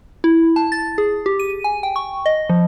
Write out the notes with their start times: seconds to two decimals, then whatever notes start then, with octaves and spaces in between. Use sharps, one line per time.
0.24 E4
0.56 A5
0.72 A6
0.98 G#4
1.26 G4
1.40 D#7
1.64 G#5
1.83 G5
1.96 C#6
2.26 D#5
2.49 F3